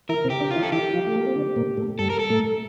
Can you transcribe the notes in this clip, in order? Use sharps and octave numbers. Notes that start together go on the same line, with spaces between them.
E3 E4 A#4
C3 C4
G4
D3 D4
F4
E3 E4
A4
E3 E4 G4
F3 F4
A3
A#3
C4
D3 D4
A#2 A#3
A2 A3
G2 G3 A4
A#4
A4
A2 A3